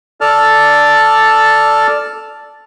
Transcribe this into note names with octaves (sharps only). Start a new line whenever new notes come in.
A4 D5 A5 F6